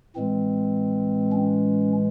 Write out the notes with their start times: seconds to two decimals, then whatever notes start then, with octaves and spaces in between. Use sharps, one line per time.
0.16 A2 E3 G#3 C4
1.32 C#4